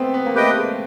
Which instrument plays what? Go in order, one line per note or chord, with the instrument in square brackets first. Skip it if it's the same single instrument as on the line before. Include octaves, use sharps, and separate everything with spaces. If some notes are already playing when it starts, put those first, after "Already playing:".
Already playing: [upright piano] A3 B3 C4
B3
A#3
[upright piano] A3 [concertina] G4 B4 D#5 G5
[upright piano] G#3